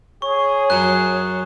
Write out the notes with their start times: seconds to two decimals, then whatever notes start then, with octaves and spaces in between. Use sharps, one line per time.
0.22 G#4 C#5 C#6
0.70 F#2 F#3 F#6